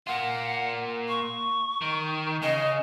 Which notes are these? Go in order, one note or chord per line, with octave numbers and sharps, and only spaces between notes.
A#3 F4 F#5
C#6
D#3
C#3 D#5